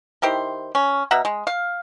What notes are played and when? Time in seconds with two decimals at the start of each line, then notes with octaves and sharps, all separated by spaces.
0.22 D#3 E4 G4 C5
0.75 C#4
1.11 B2 E5 F#5 A#5
1.25 G#3
1.47 F5